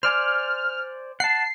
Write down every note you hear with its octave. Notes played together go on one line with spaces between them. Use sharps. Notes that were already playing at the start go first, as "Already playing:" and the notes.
C5 D5 G#5 F6
F#5 A5 C7